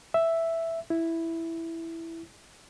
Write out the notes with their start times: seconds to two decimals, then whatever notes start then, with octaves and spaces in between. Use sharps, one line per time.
0.14 E5
0.90 E4